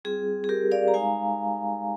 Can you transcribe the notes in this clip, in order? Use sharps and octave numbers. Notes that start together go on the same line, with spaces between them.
G3 C4 F4 G#4
G#4
G4 A#4
D5 F5
A#5
G#3 D#4 F5 G#5